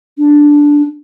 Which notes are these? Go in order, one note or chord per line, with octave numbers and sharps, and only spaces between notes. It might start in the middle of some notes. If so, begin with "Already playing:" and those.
D4